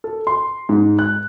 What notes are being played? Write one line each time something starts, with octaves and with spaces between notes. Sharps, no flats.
A4
C6
G#2
F#6